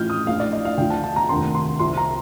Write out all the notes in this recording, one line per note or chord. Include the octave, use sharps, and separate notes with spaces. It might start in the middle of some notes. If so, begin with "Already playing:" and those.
Already playing: A1 A2 F3 F6 G6
D#6
A#1 A2 F3 F5
D5
D#5
F5
D2 D3 F3 G5
A5
A5
A#5
F1 D#2 D3 C6
C6
C2 C3 F3 C6
A#5